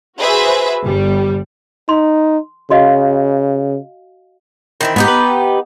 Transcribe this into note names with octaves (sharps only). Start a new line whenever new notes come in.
F#4 G#4 B4 C5 E5
G1 G3
D#4 C6
C#3 F#4 D#5 F5
D#3 E3 C4
G#2 B3 D#4 G4
B4